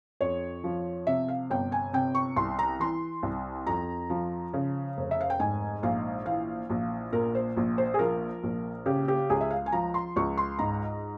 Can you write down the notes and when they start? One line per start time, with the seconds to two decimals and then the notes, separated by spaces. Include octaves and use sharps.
0.21 F2 C#5
0.64 F3
1.07 C3 E5
1.28 F5
1.50 G1 G5
1.72 G#5
1.93 C3 G5
2.15 C#6
2.36 C2 C6
2.59 A#5
2.80 E3 C6
3.23 C2
3.67 F2 A#5
4.10 F3
4.53 C#3
4.97 F1
5.11 E5
5.21 F5
5.30 G5
5.39 G#2 G#5
5.83 A#1 F5
6.26 E3 F5
6.70 A#1
7.13 A#2 A#4
7.35 C5
7.57 A#1
7.78 C5
7.94 G#4
7.99 F3 A#4
8.43 A#1
8.86 C#3 G4
9.08 G4
9.30 C#2 G#4
9.41 E5
9.51 F5
9.66 G#5
9.72 F3 A#5
9.94 C6
10.16 C#2 C#6
10.37 C6
10.59 G#2 A#5